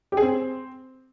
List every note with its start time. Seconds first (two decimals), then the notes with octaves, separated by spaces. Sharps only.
0.12 G4
0.17 G#4
0.22 C4